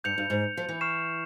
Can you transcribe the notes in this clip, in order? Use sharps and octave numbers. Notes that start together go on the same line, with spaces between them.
G2 G6 C#7 F7
G2
G#2
F3
E3
C#6 F6 C7 E7